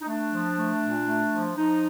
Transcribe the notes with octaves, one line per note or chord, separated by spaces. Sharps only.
D#4
A3 D4
F3
A3
A#2
A3
F3
F3 D#4